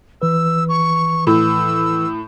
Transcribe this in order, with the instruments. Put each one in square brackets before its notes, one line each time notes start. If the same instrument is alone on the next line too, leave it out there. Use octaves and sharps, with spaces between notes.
[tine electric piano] E3 B4 [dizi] E6
[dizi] C#6
[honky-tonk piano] A2 [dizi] E6